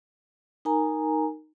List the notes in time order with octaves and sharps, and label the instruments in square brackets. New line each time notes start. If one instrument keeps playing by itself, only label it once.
[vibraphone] D#4 A#4 G#5 A#5